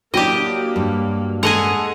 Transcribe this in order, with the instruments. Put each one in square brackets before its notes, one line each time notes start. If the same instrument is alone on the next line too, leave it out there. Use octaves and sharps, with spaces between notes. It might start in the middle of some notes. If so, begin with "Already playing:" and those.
[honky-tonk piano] F#3 D4 [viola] A#3 [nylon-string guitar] E4 G5 [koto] G4 D#5
[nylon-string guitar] G2
[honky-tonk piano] G#3 A4 F7 [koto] G#4 D#5 F#5